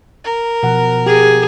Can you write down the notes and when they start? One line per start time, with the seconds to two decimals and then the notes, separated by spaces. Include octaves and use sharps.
0.24 A#4
0.63 B2 F3 F#5
1.06 G4 G#4